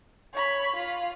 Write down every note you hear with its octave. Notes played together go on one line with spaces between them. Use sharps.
C#5 B5
F4